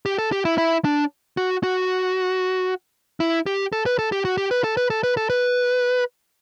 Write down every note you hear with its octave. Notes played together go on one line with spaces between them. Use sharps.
G4
A4
G4
E4
E4
D4
F#4
F#4
E4
G4
A4
B4
A4
G4
F#4
G4
B4
A4
B4
A4
B4
A4
B4